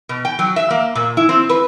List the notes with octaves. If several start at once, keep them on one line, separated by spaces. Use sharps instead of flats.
B2
G5
F#3
E5
A#3
A#2
E4
C4
B4